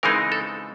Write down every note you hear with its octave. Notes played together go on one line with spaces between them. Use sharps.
C#3 E3 G#3 C4 D#4 A#4
A4